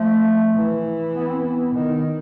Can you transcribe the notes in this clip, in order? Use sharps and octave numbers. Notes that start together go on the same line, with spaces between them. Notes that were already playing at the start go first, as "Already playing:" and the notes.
Already playing: F3 A3
E3
B3
C4
B3
D#3